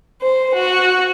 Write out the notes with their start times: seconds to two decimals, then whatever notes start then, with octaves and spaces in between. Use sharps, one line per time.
0.21 C5
0.55 F#4